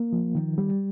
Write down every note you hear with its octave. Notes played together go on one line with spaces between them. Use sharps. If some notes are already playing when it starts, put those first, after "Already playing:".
Already playing: A#3
F3
D#3
G3